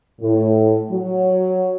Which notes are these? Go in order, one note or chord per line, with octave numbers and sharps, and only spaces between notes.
A2
F#3